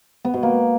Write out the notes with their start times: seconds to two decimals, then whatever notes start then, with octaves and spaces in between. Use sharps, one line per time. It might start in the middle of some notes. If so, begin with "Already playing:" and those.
0.25 B3
0.34 B2
0.43 A#3